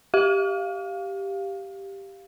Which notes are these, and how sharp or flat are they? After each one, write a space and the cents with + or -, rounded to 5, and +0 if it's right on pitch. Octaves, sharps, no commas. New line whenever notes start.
G4 +0 F5 +0